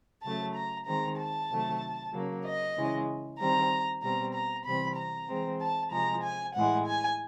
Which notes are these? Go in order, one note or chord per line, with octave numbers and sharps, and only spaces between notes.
C#3 F#3 A3 A5
A#5
D#3 G#3 C4 A#5
A5
C3 D#3 F#3 A3
C#3 F#3 A#3
D#5
C#3 E3 G#3
D#3 G3 C4 A#5
B2 G3 C4 A#5
A#5
C3 E3 G3 C4 B5
A#5
E3 G#3 C4
A5
C3 F3 G#3 A#5
G#5
A2 E3 G#3 F#5
G#5